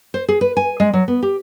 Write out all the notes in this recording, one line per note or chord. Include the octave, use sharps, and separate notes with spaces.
C5
G#4
B4
G#5
G#3
F#3
B3
G4